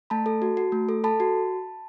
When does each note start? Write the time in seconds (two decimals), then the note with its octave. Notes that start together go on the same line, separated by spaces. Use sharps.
0.10 A3 A5 B5
0.26 A4
0.42 F#4
0.57 F#4
0.72 A3
0.89 A4
1.04 A4 A5 B5
1.20 F#4